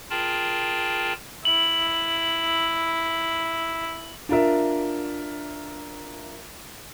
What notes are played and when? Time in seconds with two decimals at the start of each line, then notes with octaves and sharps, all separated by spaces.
0.10 F4 G#4 A#4 G5 A5 B5
1.45 E4 F#7
4.29 D4 F4 A#4 E5